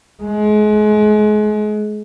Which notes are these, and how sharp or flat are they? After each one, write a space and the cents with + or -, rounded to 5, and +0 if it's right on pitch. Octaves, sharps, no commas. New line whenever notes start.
G#3 +30